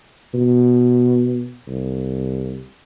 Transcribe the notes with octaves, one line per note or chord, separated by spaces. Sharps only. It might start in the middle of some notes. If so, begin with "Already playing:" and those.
B2
C2